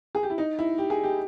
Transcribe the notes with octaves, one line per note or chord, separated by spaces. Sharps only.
G#4
G4
E4
D#4
E4
G4
G#4
G4